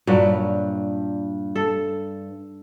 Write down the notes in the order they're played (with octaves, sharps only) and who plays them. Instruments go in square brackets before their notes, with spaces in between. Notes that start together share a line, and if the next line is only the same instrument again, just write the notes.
[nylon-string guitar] G2 [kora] A#2 F#3 B4
[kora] A4